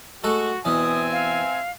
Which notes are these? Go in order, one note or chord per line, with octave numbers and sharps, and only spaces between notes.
G#3 A3 F#4 A4
E2 B2 E3 C4 E5 G#5 D#6
F5